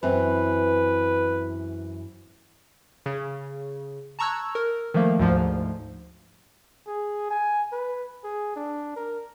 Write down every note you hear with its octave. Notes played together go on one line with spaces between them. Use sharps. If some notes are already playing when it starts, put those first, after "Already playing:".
F#2 E3 C4 B4
C#3
A5 A#5 C#6 E6 F#6 G#6
A#4
D#3 F3 A3 A#3
D2 G#2 F3
G#4
G#5
B4
G#4
D4
A#4